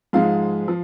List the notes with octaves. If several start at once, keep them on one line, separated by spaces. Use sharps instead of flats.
G#2 F3 G#3 F5
F3